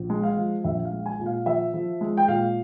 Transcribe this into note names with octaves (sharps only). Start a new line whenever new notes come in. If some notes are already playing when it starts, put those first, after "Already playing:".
Already playing: A#1
G#3
F5
F3
A#1 E5
F5
G#3
G#5
A#2
F5
F3 E5
F3
G#3
G5
A#2 F5